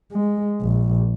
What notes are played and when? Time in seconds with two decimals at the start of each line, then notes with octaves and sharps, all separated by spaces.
0.12 G#3
0.61 A#1